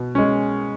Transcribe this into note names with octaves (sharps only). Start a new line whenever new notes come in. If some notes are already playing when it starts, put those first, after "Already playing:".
Already playing: B2
G#3 C#4